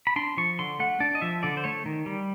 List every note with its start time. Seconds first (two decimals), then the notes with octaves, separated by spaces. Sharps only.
0.07 B5
0.16 D4 C6
0.37 F3 C#6
0.59 D3 C6
0.79 A3 F#5
1.00 D4 D5
1.15 D#5
1.22 F3 E5
1.43 D3 D5
1.57 C5
1.64 A3 C#5
1.86 D#3
2.06 G3